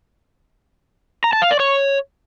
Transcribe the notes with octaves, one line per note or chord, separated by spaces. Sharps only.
A#5
A5
F5
D5
C#5